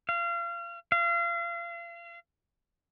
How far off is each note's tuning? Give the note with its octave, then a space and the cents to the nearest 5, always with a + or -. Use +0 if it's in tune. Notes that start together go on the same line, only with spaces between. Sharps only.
F5 -30
F5 -35